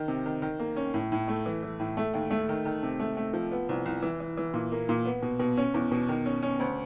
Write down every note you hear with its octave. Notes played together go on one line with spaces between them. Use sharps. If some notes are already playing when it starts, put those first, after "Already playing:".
Already playing: D#3
C3
D#3
D#3
A#3
C#4
A2
A2
A3
E3
E3
A2
A3
D#2
A3
D#3
D#3
C3
A3
A3
F3
B3
C2
C2
E3
E3
E3
A#2
A#3
A#2
B3
B2
B2
C#4
E2
B2
D#3
C#4
C#4
D2